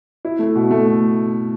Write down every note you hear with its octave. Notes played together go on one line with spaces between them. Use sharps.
E4
A3
B2
A3